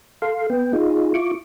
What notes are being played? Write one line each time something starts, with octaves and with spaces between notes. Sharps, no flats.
A4 F5 C6
B3 G5
D#4 F4 G#4
E4 F4 C#6 D6